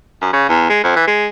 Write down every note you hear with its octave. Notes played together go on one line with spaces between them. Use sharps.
F#2
C#3
E2
G#3
F2
E3
G#3